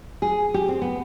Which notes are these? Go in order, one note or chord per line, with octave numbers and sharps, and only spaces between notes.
G#4
G4
C4
B3